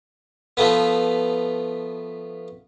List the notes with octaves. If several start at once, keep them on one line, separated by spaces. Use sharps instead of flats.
F3 A3 B3